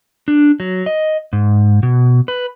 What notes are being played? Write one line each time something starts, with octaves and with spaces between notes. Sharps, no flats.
D4
F#3
D#5
G#2
B2
B4